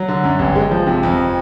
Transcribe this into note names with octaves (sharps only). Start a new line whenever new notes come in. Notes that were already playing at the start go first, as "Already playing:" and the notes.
Already playing: F#3
D3
F#2
G1
G#3
F3
C3
F2